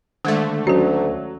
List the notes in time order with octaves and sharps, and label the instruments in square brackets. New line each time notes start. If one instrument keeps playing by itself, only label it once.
[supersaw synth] D3 A3 [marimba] D#3 G#3 A6
[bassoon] D2 [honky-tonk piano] F#3 [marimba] C#4 F#4